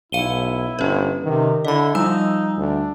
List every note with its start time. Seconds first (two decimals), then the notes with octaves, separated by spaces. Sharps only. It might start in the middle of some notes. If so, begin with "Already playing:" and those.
0.12 B1 E4 F5 D#7 G7
0.79 G1 C#4 B4
1.24 C3 D#3
1.65 D3 E4 D#5 B5
1.95 F3 G3 D#4 G#5 E6
2.57 D2 D4